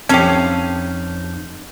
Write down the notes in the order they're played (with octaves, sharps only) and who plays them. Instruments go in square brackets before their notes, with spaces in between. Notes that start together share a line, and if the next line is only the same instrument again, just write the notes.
[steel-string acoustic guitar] F2 D#4 [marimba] C4 [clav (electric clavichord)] C#4 F5 [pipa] G4 A4